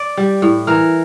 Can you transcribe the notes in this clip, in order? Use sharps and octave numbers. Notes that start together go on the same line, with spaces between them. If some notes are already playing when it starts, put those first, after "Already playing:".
Already playing: D5
G3
A2
E3 A#4